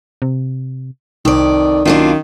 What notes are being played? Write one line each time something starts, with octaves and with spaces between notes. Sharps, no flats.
C3
C2 F2 D#3 D5
F#2 D#3 A#3 D4 F4